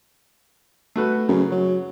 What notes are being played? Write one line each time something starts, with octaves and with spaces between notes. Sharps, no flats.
A3 F#4 B4
F#2 C#3
F#3